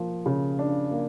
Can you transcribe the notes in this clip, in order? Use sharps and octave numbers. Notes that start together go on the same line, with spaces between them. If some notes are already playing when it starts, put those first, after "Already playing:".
Already playing: F3 A#3
C#3
D4
A#3